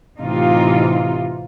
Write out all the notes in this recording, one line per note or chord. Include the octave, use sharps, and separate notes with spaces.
A2 C3 E3 D#4 F4